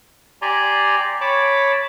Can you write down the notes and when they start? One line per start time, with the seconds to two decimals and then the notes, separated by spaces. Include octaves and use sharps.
0.42 G4 D5 G#5 A#5 C6
1.21 C#5 A5 B5 D6